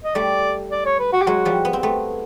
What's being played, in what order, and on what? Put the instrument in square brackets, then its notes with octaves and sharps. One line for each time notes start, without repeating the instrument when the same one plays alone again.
[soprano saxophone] D#5
[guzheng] G3 A3 [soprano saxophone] D5
[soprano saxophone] D5
C#5
B4
F#4
G4
[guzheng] F#3 G#3 [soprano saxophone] F#4
[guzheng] F3 G3
B3
C4
A3 B3